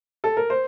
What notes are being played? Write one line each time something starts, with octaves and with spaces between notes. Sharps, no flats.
A4
A#4
C5